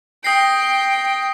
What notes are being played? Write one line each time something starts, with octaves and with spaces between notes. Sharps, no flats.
G5 D#6 A#6 C7